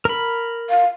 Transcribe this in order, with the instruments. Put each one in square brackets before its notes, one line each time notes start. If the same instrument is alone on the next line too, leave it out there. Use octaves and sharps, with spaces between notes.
[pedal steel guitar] A#4 B5
[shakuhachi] F5